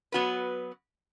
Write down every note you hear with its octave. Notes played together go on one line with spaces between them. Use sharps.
F#3 B3 F#4 B4